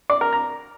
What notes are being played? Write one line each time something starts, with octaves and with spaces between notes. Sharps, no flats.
D5
A#4
A#5